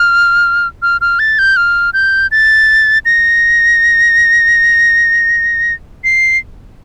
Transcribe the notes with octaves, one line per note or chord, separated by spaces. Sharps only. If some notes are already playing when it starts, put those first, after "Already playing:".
Already playing: F6
F6
F6
A6
G6
F6
G6
A6
A#6
C7